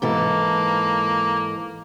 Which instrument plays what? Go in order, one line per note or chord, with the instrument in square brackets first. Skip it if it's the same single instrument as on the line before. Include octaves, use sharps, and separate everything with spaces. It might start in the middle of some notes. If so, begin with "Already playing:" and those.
[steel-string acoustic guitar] G#2 E3 A4 [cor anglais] A#3